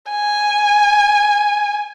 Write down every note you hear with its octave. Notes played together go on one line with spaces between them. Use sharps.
G#5